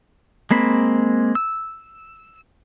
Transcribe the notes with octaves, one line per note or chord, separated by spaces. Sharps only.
G#3 A#3 C4 B5
E6